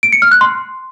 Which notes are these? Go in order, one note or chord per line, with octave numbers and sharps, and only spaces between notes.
D7
C#7
F6
F#6
C6